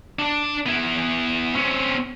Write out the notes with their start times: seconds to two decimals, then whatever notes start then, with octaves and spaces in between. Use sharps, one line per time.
0.19 D4 D5
0.66 B3 E4
1.55 C4 C#4